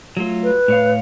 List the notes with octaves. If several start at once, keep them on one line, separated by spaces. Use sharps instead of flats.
F#3 A3 F4
B4
A2 C#5 F5